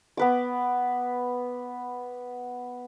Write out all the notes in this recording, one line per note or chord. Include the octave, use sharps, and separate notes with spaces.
B3 B4 D6